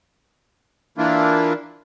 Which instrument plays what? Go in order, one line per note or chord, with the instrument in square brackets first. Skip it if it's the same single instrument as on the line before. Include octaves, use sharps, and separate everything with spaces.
[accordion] E3 A#3 D4 E4 F4